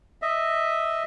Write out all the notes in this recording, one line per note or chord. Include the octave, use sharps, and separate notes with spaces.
D#5 E5